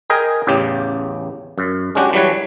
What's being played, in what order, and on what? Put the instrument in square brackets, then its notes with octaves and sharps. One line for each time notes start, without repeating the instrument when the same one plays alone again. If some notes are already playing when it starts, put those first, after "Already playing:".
[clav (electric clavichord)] G#4 A#4 D#5 G5 G#5
A1 E2 C#3 G4
F#2
G#3 C#4 D4 F#4 G4
E3 F#3 G3 B4 C#5